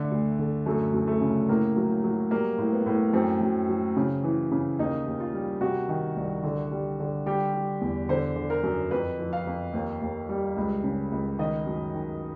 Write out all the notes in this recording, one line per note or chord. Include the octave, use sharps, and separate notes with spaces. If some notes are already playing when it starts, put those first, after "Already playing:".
Already playing: D3 A3
D2
D3
F#2 A3
F#2
A3
C#3
A2 A#3
F#3
F#3
G3 A#3
A2
B3
A2
F#2 C4
F#2
F#3
C#3
E3
C#3
D#2 D#4
D#2
F4
G3
C3 F#4
D#3
C2
D3
G3
D3
G3 G4
G3
E2
D3 C5
D3
A#4
F#2
F2 B4
F3
F5
F2
D#2
D#2
G3
C#2
C#3
C#2
D#3 D#5
F#2
D#3